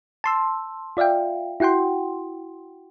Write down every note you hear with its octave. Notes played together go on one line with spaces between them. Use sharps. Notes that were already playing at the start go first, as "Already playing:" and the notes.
A5 C6 E6
F4 D5 E5 F5 G5
E4 F#4 F#5 G5 C6